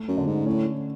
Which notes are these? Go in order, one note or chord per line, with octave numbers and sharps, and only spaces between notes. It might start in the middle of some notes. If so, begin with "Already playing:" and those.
Already playing: A3
F#2
D3
G#2
A2 C#4